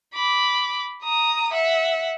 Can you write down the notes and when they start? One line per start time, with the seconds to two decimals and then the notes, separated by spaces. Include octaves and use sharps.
0.14 B5 D6
1.03 A#5 D#6
1.52 E5 F#5